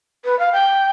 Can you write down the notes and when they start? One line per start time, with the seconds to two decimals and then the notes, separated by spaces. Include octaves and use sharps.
0.25 B4
0.39 F5
0.52 G5